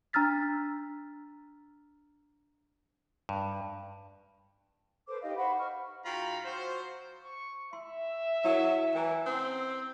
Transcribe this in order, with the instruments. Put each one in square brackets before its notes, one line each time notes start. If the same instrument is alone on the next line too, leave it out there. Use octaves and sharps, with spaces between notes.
[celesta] D4 A#5 E6 F6 A6 B6
[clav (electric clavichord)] G2
[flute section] A4 B4 C5 D6
D#4 G4 D#5 F5
C5 F#5 B5 C#6
C#6 F6
[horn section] G#2 F4 F#4 G5 A#5 B5
F#3 F4 F#4 C5
[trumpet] C#6
[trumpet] E5 [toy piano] C6
[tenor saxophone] F#3 [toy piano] E4 A#4
[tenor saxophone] E3 [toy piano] G5 G#5 A#5
[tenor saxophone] C4 [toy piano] C#4 F#5 C6